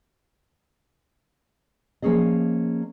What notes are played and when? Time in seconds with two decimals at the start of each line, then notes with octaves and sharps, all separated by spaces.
2.02 F3 A#3 C4 C#4 G#4 D#5